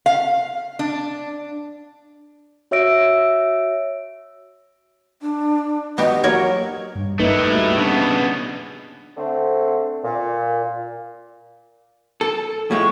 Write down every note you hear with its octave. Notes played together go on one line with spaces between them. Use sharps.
F5
D4
F#4 C#5 E5 E6 A#6 D7
D4
B3 F#4 G4 D#5
F#3 A#3 A#4 C#5
G2
A3 A#3 D#4 E4 B4
D2 G3
C#3 B3 D4
D3 A3 C4
A#2
A4
A2 F3 G#3 C#6